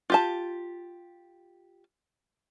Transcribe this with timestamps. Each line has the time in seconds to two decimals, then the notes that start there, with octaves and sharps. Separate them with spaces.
0.10 F4 G4 A5